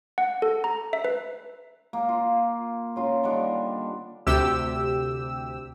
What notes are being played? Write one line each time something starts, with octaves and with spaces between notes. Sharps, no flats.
F#5
A4
A#5
E5
B4
A#3
F4
C#3 F4 A#4
D3 D#3 G3 D4
D2 C3 G4 E6